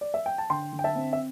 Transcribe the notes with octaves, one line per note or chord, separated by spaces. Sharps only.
D5
E5
G5
A5
D3 G5 C6
D3
G5
E5 A5
C4
E5